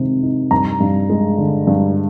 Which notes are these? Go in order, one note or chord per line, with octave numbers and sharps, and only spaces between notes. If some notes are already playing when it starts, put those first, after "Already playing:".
Already playing: C3 D#3 G#3
D#4
G2 A#5
G2
G#3
D3
G2